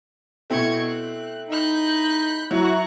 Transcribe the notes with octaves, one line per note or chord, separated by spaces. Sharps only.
B2 A3 C4 E4 C#6 G#6
F#6
D#4 B5 F#6 G6
F#3 E4 F#4 A#5 C#6 F#6